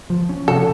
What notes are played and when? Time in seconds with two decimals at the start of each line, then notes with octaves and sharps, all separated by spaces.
0.10 F3
0.29 C#4
0.48 C3 A4